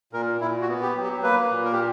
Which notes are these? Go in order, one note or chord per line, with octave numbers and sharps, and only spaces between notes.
A#2 A#4
A#2 E4
F#4
B3
G4
F#3
G4
A#3 B4
A#2
A#4
G4